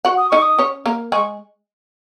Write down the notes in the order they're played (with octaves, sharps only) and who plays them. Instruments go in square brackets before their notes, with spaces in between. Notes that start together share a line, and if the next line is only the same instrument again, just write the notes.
[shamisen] F#4 F#5
[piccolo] D#6
[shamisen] D#4 D#5 [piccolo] C#6
[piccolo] D#6
[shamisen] C#4 C#5
A#3 A#4
[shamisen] G#3 G#4 [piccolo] C#6